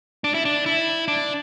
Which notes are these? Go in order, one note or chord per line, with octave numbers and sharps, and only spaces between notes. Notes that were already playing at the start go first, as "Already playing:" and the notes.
D4
E4
D4
E4
D4